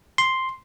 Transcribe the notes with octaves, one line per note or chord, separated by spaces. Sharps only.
C6